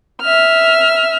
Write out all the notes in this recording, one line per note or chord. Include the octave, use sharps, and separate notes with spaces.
E5 F6